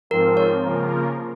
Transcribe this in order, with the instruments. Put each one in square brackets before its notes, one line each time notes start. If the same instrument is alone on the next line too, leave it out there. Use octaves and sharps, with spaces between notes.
[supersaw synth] G#2 F3 C4 F4 [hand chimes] A#4
[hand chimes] C#5
[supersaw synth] C#3 F3 A#3 F4 A#4